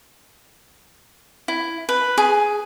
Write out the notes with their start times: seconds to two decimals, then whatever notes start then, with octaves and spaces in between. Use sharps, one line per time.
1.48 E4
1.89 B4
2.18 G#4